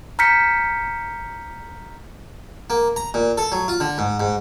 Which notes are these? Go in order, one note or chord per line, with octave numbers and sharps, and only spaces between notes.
A#5 F6 G6 B6 C#7
A#3
A#5
A#2
A4
F#3
F4
D3
G#2
G#2